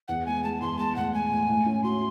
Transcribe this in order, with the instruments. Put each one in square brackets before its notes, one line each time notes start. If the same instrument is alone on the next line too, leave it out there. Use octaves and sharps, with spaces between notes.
[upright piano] E2 [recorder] F#5
[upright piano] G#3 [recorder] G#5
[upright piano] G#3 [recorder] A5
[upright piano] E2 [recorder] C6
[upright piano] G#3 [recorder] A5
[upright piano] A2 [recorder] F#5
[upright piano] G#3 [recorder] G#5
[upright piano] A2
A2
C#4
[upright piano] F#4 [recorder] C6